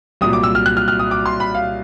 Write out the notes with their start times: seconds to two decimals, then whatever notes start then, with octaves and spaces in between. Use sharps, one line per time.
0.21 C2 A#2 F#3 D#6
0.33 D6
0.43 E6
0.55 F6
0.66 F#6
0.77 F6
0.88 F6
0.99 D#6
1.11 D6
1.26 C6
1.40 B5
1.55 F5